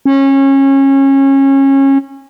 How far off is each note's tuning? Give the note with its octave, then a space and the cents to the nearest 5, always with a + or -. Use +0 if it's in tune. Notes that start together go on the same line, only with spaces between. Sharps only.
C#4 -25